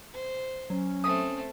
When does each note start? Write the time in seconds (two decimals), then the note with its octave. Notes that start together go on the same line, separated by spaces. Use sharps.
0.14 C5
0.70 F#3 C#4
1.04 A3 C4 D#6